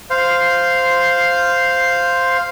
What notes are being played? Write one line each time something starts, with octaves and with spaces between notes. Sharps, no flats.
C5 F5